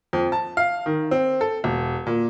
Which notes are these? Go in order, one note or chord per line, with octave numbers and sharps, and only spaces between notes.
F2
A5
F5
D#3
C4
A4
E1
A#2